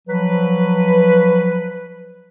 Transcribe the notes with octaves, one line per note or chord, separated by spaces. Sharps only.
F3 F#3 B4